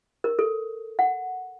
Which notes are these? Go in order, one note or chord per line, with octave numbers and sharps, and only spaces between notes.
A#4
A4
F#5